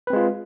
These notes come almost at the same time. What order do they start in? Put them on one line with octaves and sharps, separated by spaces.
B4 C4 G#3 F4